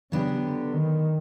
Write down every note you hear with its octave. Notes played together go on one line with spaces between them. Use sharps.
C#3 F#3 B3 D4 G4
D3
D#3